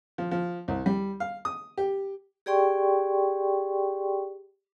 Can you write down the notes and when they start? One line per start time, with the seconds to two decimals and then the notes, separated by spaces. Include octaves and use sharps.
0.18 F3
0.31 F3
0.68 C2
0.86 G3
1.20 F5
1.45 D#6
1.77 G4
2.46 G4 G#4 D5 G5 C6 C#6